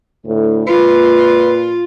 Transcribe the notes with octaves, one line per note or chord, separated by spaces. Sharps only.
D2 A2
A#2 F4 B4